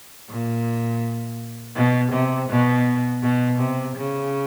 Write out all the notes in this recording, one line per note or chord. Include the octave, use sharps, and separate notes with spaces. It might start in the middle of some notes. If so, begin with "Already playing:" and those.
A#2
B2
C3
B2
B2
C3
C#3